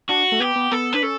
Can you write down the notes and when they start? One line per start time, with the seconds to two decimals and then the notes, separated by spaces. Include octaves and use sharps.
0.09 D4 F#4
0.32 A3
0.40 B3 G4
0.56 B3
0.71 B3 A4
0.93 D4 B4
1.03 C#4 A4